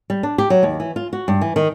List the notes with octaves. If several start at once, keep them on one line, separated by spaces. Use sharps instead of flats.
G3
D4
G4
F#3
D#2
E3
F4
F#4
G2
E3
D#3